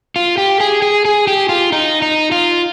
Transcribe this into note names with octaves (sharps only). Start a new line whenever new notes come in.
F4
G4
G#4
G#4
G#4
G4
F4
D#4
D#4
F4